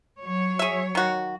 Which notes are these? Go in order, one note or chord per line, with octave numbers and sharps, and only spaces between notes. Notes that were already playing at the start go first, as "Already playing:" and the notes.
F#3 C#5
G#4 E5
D#3 F#4